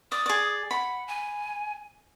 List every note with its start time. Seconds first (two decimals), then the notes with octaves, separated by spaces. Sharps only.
0.12 D5 D#6
0.26 G#4 D5
0.71 F#5 B5
1.08 G#5